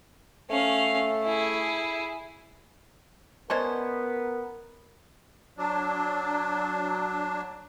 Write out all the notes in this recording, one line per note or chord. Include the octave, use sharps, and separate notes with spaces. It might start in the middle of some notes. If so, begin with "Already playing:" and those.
A3 C#4 F5
E4 G#4
G#3 B3 C#4 A#4 C5 D5 D#5 A5
F#3 D4